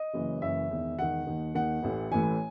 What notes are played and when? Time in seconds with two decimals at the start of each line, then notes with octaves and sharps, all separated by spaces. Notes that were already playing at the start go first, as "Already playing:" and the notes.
Already playing: D#5
0.14 F#1 F#2 E3
0.42 F#1 F#2 E3 E5
0.70 E1 E2 D#3
0.98 E1 E2 D#3 F#5
1.27 D#2 D#3
1.55 D#2 D#3 F#5
1.83 A1 A2 E3
2.11 A1 A2 E3 G#5